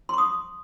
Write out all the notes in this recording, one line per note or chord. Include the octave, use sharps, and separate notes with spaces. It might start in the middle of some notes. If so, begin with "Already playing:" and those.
C6 C#6 D#6